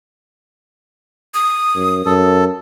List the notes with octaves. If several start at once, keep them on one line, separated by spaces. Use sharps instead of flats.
D#6
F#2
F#2 A4